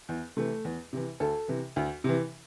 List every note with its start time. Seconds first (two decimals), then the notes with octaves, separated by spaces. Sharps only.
0.09 E2
0.37 C3 E3 A3
0.65 E2
0.93 C3 E3
1.20 D2 A4
1.48 C3 E3
1.76 D2
2.04 C3 E3